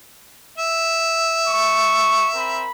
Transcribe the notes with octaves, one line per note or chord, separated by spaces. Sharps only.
E5
C#6
C4 A#4 B5